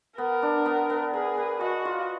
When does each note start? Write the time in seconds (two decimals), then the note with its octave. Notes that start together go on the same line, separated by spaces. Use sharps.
0.18 B3 A#4
0.42 D4
0.66 B3
0.90 B3
1.13 G#4 A#4
1.37 B4
1.61 F#4 D#5
1.85 F4